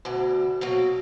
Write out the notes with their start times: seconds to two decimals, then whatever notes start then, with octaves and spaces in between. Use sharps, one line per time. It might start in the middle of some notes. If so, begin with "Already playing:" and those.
0.05 D2 B2 D3
0.61 B2 F#3 A#3